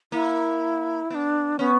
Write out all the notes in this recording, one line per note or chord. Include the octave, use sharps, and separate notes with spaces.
A#3 E4
B3 D4 E4
B3 C#4